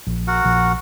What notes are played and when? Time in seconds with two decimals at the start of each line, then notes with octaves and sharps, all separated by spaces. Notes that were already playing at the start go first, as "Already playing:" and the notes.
0.07 A#1
0.28 F#4 A#4 F#5
0.45 A#1